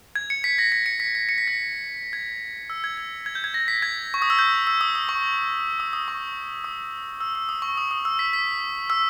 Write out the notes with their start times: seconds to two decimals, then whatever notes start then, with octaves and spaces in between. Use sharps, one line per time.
0.16 G#6
0.30 C#7
0.44 B6
0.58 A#6
0.72 B6
0.86 C#7
1.00 B6
1.15 B6
1.29 C#7
1.38 B6
1.48 A#6
2.13 G#6
2.70 E6
2.84 G#6
2.97 G#6
3.26 G#6
3.35 G6
3.44 G#6
3.54 A#6
3.68 B6
3.82 G#6
4.14 C#6
4.22 D#6
4.30 E6
4.39 G6
4.67 E6
4.81 D#6
4.95 D#6
5.09 C#6
5.80 D#6
5.93 D#6
6.08 C#6
6.64 D#6
7.21 E6
7.35 E6
7.49 D#6
7.62 C#6
7.77 D#6
7.91 D#6
8.05 E6
8.19 B6
8.33 B6
8.90 E6